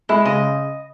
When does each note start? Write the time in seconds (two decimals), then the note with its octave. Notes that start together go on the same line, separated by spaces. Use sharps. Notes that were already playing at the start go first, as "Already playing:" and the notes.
0.09 G#3 E4
0.25 C#3 D#5